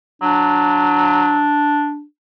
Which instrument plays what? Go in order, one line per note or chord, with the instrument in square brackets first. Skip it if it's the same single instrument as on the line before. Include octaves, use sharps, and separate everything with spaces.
[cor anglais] F#3 [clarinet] D4